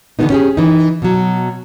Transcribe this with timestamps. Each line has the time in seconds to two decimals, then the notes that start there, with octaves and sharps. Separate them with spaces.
0.19 D3 E3 F3 G3 B3 D#4
0.30 C#4 G4 G#4
0.57 E3 D#4
1.02 B2 F#3